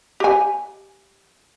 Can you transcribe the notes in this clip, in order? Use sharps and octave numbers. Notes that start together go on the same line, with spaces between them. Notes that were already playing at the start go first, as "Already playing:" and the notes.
G4 G#5